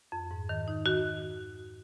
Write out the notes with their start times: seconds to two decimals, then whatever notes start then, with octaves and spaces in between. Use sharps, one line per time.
0.12 F2
0.31 G#2
0.49 D#3
0.68 D#4
0.86 D#3 F#4